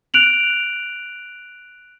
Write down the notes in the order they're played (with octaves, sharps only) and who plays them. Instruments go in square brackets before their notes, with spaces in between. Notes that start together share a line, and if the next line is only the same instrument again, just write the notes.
[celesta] F#6 D7 F7 F#7